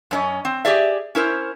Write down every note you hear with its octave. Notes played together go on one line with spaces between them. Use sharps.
F#2 C#4 D#5
C4
G4 G#4 D5 E5
C#4 E4 A#4 C5